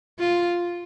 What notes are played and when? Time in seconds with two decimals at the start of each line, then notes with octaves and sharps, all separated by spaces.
0.19 F4